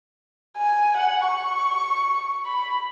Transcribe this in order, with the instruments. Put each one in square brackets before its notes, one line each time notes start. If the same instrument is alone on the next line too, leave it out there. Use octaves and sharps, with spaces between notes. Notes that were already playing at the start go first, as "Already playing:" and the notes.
[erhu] G#5
F#5
C#6
B5